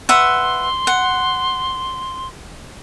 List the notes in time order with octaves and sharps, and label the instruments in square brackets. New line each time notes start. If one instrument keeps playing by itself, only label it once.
[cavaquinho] B4 E5 F#5 [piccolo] C6
[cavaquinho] F#5